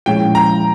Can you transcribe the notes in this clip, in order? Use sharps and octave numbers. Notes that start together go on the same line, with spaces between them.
A#2 F3 G#3 C#4 E4 G5
A#5